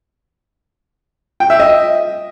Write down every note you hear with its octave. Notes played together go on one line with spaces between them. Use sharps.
G5
E5
D#5